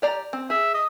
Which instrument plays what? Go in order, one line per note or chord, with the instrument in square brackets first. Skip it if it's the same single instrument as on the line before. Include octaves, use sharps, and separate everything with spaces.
[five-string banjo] G4 D5 A#5
C4
[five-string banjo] G#4 [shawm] E5
[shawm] D#5